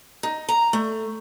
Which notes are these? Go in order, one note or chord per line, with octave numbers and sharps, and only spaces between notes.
D#4
A#5
A3